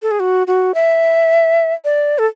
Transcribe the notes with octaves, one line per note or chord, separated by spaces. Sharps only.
A4
G#4
F#4
F#4
E5
D5
A4